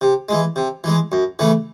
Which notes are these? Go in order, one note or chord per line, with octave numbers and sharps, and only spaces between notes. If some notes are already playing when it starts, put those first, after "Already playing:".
C3
E3 G#3
C3
E3 G#3
F#2
C#3 E3 A3